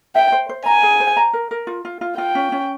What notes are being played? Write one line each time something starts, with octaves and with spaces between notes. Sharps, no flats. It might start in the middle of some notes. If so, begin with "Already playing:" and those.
E5 G5
C5
C5
G#5 A#5
G#4
C5
A#5
A#4
A#4
F4
F4
F4
F4 G5
C#4
C#4